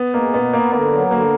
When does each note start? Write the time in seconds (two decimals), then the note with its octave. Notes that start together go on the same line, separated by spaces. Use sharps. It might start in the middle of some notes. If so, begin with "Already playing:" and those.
Already playing: B3
0.14 G#3 A#3
0.33 B2 B3
0.52 A#3 B3
0.72 D3 A#3
0.92 F#3
1.11 D3 A#3